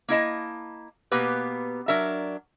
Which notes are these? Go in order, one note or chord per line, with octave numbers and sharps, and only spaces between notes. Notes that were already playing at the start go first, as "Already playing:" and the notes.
A#3 E4 D#5 A5
B2 A#3 B3 G4 B4
F#3 D4 A#4 E5